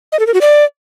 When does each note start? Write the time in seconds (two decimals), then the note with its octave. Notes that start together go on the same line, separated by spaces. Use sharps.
0.12 D#5
0.19 A4
0.27 A#4
0.34 F#4
0.41 D5